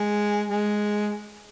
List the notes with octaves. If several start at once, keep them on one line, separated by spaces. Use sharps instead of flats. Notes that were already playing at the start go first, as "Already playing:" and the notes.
Already playing: G#3
G#3